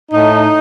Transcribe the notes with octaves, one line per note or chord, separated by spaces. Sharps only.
A2 D#4